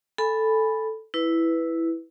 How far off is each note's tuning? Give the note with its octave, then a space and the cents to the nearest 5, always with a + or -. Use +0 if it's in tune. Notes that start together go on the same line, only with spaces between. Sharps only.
A4 +0 G#5 +0 B5 +0
E4 +0 B4 +0